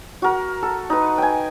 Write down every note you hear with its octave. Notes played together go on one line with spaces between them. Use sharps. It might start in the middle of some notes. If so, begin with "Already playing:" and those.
F#4 A#4
A4
D#4 B4
G5 G#5